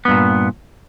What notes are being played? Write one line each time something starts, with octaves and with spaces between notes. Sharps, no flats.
G2 A#2 B3